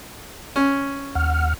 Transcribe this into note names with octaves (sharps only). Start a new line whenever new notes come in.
C#4
D#2 F#5 F6